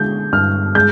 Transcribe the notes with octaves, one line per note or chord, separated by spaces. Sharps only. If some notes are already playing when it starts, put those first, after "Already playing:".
Already playing: D3 G#3 G6
G2 F6
G#3 G6